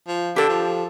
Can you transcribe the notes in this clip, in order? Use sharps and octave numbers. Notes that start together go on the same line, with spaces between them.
F3
D3 G4 A4
F3